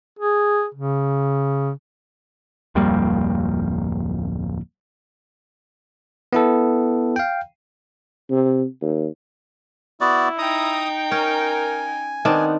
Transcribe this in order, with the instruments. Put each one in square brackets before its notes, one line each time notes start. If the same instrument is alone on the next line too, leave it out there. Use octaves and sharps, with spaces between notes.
[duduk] G#4
C#3
[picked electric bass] D1 F2 G3 A#3
[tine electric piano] B3 E4 A4
F5 G5
[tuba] C3
D#2
[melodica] B3 F#4 D5 [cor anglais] E4
[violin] D#4 G5 [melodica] A#5 D#6
[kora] C#4 [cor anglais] A#4 [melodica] G#5
[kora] D#3 C4 D4 [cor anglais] B3